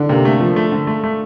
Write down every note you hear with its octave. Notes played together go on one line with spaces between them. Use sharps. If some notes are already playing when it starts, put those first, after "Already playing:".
Already playing: D3 D4
C3 A#3
A3
F3
A3
D3
A3
A3